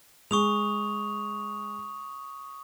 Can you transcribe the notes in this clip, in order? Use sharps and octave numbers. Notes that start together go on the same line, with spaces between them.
G#3 C#6 D#6 F7